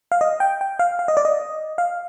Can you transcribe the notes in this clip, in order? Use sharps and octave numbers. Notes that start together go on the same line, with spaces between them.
F5
D#5
G5
G5
F5
F5
D#5
D5
D#5
F5